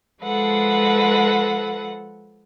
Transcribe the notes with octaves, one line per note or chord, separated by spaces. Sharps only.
F3 G#3 A4 B4 F#5